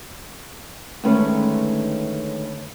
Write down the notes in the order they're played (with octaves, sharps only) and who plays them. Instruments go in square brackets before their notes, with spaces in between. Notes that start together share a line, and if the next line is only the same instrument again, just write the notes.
[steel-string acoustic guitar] D2 D#3 G#3 A3 C#4 B4